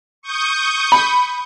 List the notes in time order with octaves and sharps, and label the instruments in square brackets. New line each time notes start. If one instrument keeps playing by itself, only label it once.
[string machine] C#6 D#6 G6
[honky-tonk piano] B5